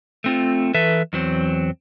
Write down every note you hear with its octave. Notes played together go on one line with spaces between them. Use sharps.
A3 C4 F4
E3 A4 B4 E5
E2 F#3 C4